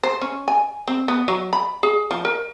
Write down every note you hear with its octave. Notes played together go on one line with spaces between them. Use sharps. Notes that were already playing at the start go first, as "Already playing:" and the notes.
C5
C#4
G#5
C4
B3
F#3
B5
G#4
F3
A#4